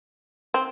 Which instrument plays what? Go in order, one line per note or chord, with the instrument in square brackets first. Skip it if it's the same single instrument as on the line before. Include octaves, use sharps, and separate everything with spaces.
[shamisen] C4